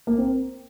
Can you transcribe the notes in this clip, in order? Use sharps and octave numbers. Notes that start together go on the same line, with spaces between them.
A#3
C4